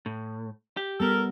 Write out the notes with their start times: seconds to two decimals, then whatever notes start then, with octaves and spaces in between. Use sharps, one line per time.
0.06 A2
0.77 G4
1.00 G3 B3 A4 A#4